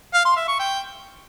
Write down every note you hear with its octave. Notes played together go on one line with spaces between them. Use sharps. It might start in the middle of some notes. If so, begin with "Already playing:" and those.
F5
C6
E5
C#6
G5